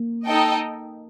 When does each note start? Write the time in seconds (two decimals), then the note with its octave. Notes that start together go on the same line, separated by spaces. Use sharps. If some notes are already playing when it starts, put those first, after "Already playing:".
Already playing: A#3
0.26 D#4 A4 D#5 G5